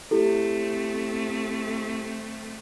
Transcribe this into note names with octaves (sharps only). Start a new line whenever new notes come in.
A3 C4 E4 G4 A4